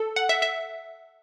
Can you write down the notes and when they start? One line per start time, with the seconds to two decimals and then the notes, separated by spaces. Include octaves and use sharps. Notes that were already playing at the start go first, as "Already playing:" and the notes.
Already playing: A4
0.16 F#5
0.29 E5
0.42 E5